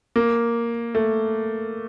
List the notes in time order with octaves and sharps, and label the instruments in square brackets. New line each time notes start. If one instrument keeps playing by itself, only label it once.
[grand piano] A#3
A3